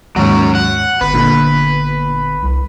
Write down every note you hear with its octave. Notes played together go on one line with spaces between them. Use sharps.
D#2 G#2 F#3 C#4
F#5
G1 B4
A#2 D3
C2